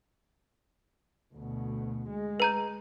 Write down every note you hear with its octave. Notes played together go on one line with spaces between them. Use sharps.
D2 B2
G#3
B4 A#5 G6